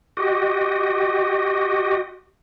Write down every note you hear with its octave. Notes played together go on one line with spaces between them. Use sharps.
F#4 G4 D#5